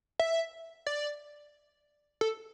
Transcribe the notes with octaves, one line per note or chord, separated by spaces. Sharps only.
E5
D5
A4